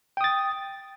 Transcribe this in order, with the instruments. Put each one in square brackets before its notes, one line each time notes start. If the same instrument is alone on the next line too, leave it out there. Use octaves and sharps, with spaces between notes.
[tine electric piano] G5
D#6
A6